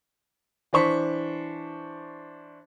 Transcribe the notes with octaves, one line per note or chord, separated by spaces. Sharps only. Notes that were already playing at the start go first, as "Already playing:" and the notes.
E3 D4 C5 C#6 B6